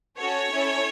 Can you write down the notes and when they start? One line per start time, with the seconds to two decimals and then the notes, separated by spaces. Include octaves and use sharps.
0.18 C#4 F#4 A4 C#5
0.51 C#4 E4 A4